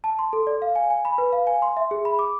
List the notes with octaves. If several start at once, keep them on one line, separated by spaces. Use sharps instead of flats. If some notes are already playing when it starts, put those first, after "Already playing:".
A5
C6
A4
D5
F5
G#5
G#5
B5
B4
F5
G#5
C6
E5
G#4
B5
D6